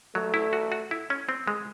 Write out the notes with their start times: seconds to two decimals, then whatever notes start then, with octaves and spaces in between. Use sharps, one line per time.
0.15 F#3 A3
0.34 E4
0.53 F#4
0.72 F#4
0.91 E4
1.10 C#4
1.29 C4
1.48 G#3